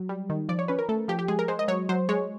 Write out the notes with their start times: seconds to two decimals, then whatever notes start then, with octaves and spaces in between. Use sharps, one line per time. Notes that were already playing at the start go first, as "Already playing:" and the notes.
Already playing: F#3
0.09 G3
0.30 D#3
0.49 F3 D5
0.59 C#5
0.68 C#4 B4
0.79 A#4
0.89 A3 A4
1.08 F3 G4
1.19 G4
1.28 G#3 G#4
1.39 A#4
1.48 G#3 C5
1.59 D#5
1.68 F#3 C#5
1.89 F#3 C5
2.09 G#3 C#5